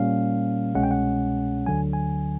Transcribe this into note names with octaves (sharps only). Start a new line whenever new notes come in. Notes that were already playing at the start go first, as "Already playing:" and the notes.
Already playing: A#2 G3 A#3 C#4 F5
C2 B2 G#3 C#4 F#5
G5
F#5
D2 D3 F#3 G#5
G#5